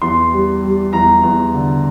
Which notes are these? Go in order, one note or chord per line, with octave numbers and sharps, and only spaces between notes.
E2 C6
G3
G3
E2 A#5
E2
D3